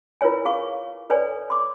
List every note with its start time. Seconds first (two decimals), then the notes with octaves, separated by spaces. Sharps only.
0.21 E4 F4 A#4 B4 C#5 G#5
0.45 G#4 F5 C#6
1.10 A4 B4 C#5 D5 G#5
1.50 C6 D6